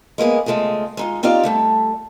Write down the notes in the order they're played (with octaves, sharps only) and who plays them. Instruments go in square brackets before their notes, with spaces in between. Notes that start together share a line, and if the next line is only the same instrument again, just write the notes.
[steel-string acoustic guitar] G#3 A#3 B3 G#4
C#3 G#3 A3 F4 G#4
G#3 D#4 F4
C4 D#4 F4 G4 D5 F5
G3 A3 A4